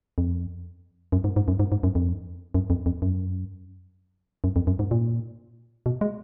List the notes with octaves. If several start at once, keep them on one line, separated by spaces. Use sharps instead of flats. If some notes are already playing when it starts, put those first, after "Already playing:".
F2
F#2
G#2
G#2
F#2
G#2
G#2
F#2
F2
F#2
F2
F2
F#2
F#2
F2
F#2
G#2
A#2
B2
G#3